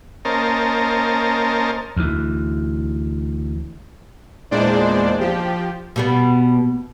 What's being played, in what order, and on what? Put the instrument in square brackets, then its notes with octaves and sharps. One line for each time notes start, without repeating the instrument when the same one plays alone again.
[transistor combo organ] A#3 C#4 A#4 C5 D#5 A5
[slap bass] D2 E3
[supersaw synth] E2 A#2 G#3 D4 C5 D5
F3 G4
[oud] B2 G3 B3